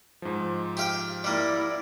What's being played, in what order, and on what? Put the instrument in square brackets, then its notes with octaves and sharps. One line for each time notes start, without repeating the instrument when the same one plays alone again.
[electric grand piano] G#2 F3
[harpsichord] G4 F5 G5
[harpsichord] G3 A#3 [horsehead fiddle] E4 D5